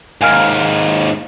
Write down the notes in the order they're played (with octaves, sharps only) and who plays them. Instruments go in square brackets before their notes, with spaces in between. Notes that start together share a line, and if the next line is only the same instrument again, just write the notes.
[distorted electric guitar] D#2 G#2 [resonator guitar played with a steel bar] A#4 F5 G#5